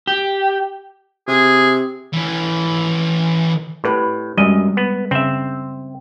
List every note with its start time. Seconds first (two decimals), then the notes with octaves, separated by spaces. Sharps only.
0.07 G4
1.28 C3 G#4
2.14 E3 C#4
3.84 A2 G4 B4
4.37 F#2 G3 G#3 D#5
4.77 B3
5.11 C#3 C4 E5